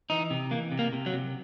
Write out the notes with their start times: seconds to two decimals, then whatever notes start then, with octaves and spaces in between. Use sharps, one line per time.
0.10 E3 D#4
0.31 C3
0.51 E3 A#3
0.72 C3
0.79 A#3
0.93 C3
1.06 F#3
1.13 C3